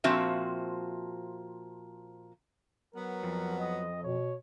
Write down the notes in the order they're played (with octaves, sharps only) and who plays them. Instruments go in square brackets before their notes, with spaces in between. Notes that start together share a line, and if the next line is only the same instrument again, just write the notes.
[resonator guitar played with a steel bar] A#2 F3 C4 F#4 E5
[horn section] F#3 B3 [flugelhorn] A#4
[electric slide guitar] F2
[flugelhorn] D#5
[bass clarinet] B2 [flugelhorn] C#5